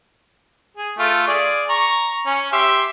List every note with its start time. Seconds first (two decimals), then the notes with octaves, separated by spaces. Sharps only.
0.77 G#4
0.98 A3 F4
1.27 G#4 D5
1.69 A#5 C#6
2.27 C#4
2.53 G4 E5 C6